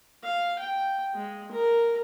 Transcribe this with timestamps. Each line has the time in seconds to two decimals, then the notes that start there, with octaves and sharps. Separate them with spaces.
0.23 F5
0.59 G5
1.15 G#3
1.52 A#4